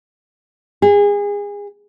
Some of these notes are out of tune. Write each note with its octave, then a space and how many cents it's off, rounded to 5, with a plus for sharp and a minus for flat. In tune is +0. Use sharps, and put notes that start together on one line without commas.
G#4 -30